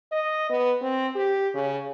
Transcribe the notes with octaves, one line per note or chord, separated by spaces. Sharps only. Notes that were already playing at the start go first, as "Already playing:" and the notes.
D#5
B3
C4
G4
C#3